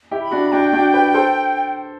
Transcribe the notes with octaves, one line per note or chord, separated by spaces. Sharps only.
E4 G4
B5
D4 F#4
D4 F#4 G5
D4 F#4
G4 B4
A4 C5